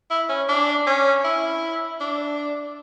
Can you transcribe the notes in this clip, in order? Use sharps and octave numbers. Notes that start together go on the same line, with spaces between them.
E4
C#4
D4
C#4
E4
D4